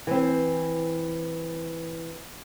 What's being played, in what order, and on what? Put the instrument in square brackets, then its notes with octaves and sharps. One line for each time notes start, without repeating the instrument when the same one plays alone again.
[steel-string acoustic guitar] E3 C4